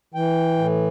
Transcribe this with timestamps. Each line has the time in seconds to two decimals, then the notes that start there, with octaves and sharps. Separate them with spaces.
0.14 E3 G5
0.58 A2